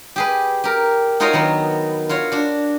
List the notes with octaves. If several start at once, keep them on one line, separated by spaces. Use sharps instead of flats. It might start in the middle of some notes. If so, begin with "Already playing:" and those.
G4 G#4 B4
G4 A#4
D#4 F4 F#4 A#4 C#5 D#5
D#3 F#3 B3
F4 F#4 C#5
D4 F#4